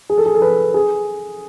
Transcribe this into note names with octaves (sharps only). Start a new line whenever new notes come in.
G#4
A4
G#4
A4
B4
G#4